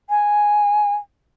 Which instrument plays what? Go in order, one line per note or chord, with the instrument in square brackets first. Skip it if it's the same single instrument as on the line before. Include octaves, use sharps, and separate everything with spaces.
[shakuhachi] G#5